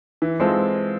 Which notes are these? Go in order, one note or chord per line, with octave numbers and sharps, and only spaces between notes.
E3
G#3 C4 F4 A4